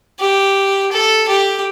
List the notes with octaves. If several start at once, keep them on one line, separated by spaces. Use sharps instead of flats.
G4
A4
G4